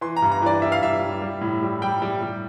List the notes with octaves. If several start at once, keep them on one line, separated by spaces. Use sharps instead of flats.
E3 C6
A#5
G2
A#5
E3 D5
G3 E5
F5
G2 E5
G3
G3
A2
G3
G3 G5
G3
G3